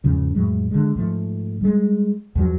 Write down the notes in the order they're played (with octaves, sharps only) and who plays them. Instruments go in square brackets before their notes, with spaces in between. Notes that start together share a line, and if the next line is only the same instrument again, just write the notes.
[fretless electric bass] E2 G#2 C#3 F3
F2 A2 F#3 G#3
D3 G#3
G#2 F3 A3
G3 G#3
E2 G2 F3 F#3